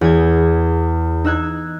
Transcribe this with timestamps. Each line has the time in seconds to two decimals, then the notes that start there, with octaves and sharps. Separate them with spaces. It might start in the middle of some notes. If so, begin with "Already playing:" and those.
0.01 E2 G#4 G#6
1.24 D#4 E6 F#6 G#6